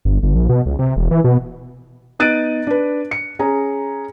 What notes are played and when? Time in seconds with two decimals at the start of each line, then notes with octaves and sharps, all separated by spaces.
0.05 G1
0.23 G1
0.35 A#1
0.49 B2
0.66 C#2
0.79 C3
0.96 E1
1.11 E3
1.24 B2
2.19 B3 D#4 F#6 A6 D7 D#7
2.67 D4 B4
3.11 C#7
3.39 C#4 G#4 A#5